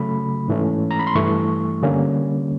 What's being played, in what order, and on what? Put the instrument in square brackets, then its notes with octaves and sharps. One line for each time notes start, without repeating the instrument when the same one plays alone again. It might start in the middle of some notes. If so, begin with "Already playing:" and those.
Already playing: [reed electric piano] C#3 F#3 A3 B5
G#2 E3 A3 C#4
A#5
B5
C6
G2 E3 A3 C#6
D3 G3 A#3 C#4